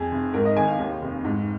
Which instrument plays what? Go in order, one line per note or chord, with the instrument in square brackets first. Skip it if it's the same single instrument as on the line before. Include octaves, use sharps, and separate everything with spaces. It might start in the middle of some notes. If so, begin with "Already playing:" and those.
Already playing: [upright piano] F2 G#4
F1
G#2 A#4
D#5
G#1 G#5
F5
D#2
F1
G#2